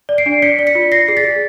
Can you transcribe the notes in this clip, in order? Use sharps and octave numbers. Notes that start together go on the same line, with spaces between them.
D5
C7 D7
D4
D5 B6 C#7
D5
B6 C#7
F4
D5 A#6 C7
G#4
A6 B6
G#4